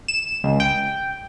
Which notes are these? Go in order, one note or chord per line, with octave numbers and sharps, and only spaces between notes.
E7
C#2
G5